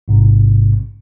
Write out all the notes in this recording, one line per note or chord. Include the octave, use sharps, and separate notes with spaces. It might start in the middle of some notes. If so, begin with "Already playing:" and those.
A1 G#2 C3